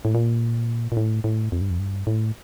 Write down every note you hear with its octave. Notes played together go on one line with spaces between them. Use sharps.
A2
A#2
A#2
A2
A2
F2
G2
F2
G2
A2